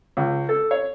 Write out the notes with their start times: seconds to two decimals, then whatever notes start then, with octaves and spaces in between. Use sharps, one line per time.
0.17 C#2
0.49 A4
0.71 C#5